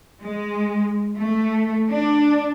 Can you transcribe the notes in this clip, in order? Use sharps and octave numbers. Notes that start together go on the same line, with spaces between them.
G#3
A3
D4